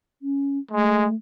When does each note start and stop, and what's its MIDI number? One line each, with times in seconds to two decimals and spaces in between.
0.22 0.58 61
0.71 1.06 56
0.71 1.15 57